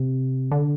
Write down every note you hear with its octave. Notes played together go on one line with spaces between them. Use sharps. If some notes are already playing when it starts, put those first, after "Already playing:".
Already playing: C3
D3